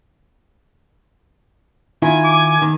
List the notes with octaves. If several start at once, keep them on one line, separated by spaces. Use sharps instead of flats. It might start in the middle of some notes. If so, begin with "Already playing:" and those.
D#3 E4 F4 G#5
D6
D#3